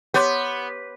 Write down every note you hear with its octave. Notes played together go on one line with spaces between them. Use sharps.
B3 G4 C#5 C6 D6 G6